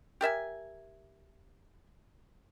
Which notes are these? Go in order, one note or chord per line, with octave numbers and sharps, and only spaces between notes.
G4 A#4 E5 G#5